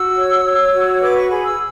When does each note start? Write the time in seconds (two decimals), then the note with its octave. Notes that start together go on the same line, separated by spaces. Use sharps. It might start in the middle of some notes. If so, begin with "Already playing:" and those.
Already playing: F#4 E6
0.16 C#5
0.44 C#5
0.73 F#4
1.02 B4 D6
1.15 C#6
1.30 G#4 B5
1.44 E6